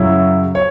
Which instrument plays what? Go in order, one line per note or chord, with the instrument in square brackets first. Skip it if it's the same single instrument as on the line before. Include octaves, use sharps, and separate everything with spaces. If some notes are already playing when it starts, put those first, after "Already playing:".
Already playing: [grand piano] F#2 C#3 F#3 E4
C#5